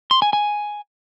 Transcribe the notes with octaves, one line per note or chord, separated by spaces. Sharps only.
C6
G#5
G#5